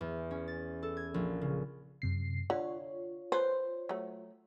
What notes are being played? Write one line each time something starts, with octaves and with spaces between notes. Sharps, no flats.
E2
C#4
A6
A4
G#6
A#1
C#3
F#2 C3 C7
D3 F4 C#5
B4 C5
F#3 A3